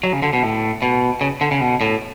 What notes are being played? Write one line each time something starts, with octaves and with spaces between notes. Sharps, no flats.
F#3
C#3
D3
B2
A2
B2
C#3
D3
C#3
B2
A2